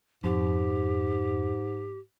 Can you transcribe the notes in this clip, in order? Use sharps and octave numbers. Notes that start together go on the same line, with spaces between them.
F2 G#2 G4